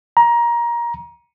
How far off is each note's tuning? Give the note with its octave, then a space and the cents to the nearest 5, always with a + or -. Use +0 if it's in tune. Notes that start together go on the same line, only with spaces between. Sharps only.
A#5 +20